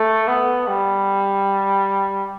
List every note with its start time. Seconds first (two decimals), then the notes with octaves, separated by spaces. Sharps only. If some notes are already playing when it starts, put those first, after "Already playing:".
Already playing: A3
0.28 B3
0.68 G3